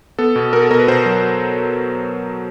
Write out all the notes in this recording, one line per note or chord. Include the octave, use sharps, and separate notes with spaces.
B3 A4
B2
B2 A#4
A4
B2 A#4
B4
B2 C5
F#3